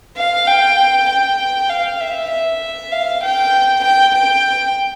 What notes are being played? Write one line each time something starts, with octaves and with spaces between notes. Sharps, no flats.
F5
G5
G5
F5
E5
E5
F5
G5
G5
G5